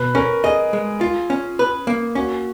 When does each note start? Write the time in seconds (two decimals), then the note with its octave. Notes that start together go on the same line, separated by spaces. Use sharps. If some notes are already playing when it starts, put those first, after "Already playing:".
Already playing: B2 B4
0.15 C#4 A#4
0.44 G#4 D#5
0.73 G#3
1.01 F4
1.30 C#4
1.59 B4
1.87 A#3
2.15 C#4 F#4